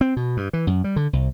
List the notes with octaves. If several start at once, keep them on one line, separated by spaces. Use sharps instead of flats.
C4
B2
G2
E3
F#2
G3
D3
C2